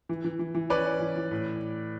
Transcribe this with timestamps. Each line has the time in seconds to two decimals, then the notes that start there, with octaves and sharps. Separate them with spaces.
0.09 E3
0.25 E3
0.39 E3
0.55 E3
0.70 C#4 B4 D5
0.86 C#4
1.00 E3
1.16 E3
1.31 A2